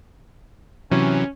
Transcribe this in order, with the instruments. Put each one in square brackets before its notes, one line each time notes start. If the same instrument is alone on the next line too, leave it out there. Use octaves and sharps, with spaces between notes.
[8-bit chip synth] C3 E3 F#3 [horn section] C#4